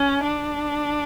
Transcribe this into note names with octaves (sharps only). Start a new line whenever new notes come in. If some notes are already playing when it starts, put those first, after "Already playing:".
Already playing: C#4
D4